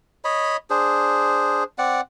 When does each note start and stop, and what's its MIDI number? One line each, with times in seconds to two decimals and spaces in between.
0.24 0.57 73
0.24 0.57 75
0.24 0.57 83
0.70 1.64 62
0.70 1.64 68
0.70 1.64 72
1.78 2.01 60
1.78 2.01 74
1.78 2.01 78